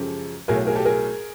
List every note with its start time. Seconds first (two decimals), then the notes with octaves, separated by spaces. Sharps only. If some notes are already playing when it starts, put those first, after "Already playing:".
Already playing: F#2 C#3 F3 G#3 G4 A4
0.48 B1 A2 F#3 G#4 A#4
0.67 G#4 A#4
0.75 G4 A4
0.85 G#4 A#4